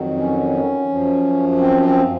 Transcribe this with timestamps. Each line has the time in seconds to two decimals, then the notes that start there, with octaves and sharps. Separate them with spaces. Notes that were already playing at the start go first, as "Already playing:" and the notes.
Already playing: F2 D#3 F#3
0.18 C#4
0.89 F#2 F3
1.58 C4
1.82 C4